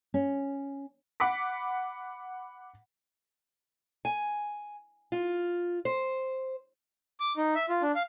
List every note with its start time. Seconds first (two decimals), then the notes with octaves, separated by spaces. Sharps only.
0.14 C#4
1.20 F#5 B5 D6 B6
4.05 G#5
5.12 F4
5.85 C5
7.20 D6
7.37 D#4
7.55 E5
7.69 F4
7.82 D4
7.95 F5